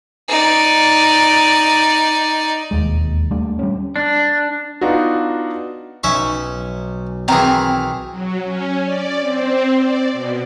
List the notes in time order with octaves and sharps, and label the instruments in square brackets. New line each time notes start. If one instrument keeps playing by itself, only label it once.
[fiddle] D#4 D5
[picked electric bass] E1 D#2 G#3
D#2 G3 A3 D4
G3 G#3 C#4
[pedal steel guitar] D4
[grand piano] B3 D4 D#4 F4 F#4
[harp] B1 [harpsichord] C#4 E5 C#6
[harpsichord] D#3 E3 G#4 [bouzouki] C4 A#5
[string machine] F#3
C#4
D5
C4
D5
B2